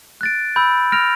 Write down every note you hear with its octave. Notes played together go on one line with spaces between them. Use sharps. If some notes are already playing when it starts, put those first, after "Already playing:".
F#6 A6 D7
B5 E6 G6
F6 A#6 D7 F7